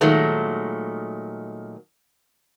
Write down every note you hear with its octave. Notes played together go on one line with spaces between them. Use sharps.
A#2 D#3 F#3 G#3 A3